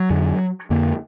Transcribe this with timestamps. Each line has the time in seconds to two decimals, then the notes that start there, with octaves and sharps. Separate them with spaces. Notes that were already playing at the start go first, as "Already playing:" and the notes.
Already playing: F#3
0.10 F2 D3
0.70 F2 D3 A#3